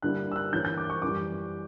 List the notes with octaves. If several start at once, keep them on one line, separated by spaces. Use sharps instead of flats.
G2 D3 G3 A#3 E4 F#6
E6
F#6
G2 E3 A#3 C#4 G6
G6
D6
C#6
F#2 E3 G3 D6